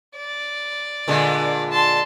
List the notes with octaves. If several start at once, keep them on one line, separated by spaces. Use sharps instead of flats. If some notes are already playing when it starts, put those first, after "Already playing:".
D5
A#2 D3 G#3
A5 C6